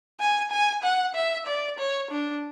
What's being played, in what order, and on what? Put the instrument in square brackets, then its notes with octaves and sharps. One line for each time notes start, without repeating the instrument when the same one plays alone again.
[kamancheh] G#5
G#5
F#5
E5
D5
C#5
D4